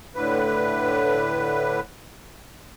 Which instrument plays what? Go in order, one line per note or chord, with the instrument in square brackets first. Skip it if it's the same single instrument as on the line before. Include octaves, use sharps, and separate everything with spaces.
[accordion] A2 D3 B4